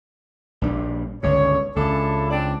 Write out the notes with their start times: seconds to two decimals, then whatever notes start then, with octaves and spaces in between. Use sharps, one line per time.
0.62 A#1 G3 D4
1.23 G1 C#2 C#3 C#5
1.76 C#2 D4 E4 A4
2.30 C4 D4 D5